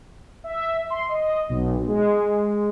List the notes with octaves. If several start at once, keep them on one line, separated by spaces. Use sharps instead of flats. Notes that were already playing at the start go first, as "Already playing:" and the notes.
E5
C6
D#5
B1
G#3